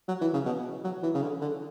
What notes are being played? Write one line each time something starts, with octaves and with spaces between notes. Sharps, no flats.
F#3
E3
C#3
B2
F#3
E3
C#3
D3
D3